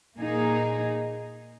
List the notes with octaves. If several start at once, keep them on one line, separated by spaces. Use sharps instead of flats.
A#2 A#3 D#4 G#4